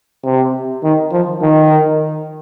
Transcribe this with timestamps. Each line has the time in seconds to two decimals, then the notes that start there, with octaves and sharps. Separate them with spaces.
0.24 C3
0.83 D#3
1.12 F3
1.42 D#3